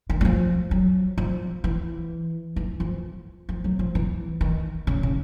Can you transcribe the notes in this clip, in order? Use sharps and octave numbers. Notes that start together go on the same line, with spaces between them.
D#3
F#3
F3
F#3
F3
E3
E3
F3
F3
F#3
F3
E3
D#3
C#3
C#3